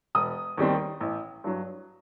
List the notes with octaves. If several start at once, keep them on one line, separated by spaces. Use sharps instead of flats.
E1 D#6
D#2 D#3 G3 C4
A1
G2 F#3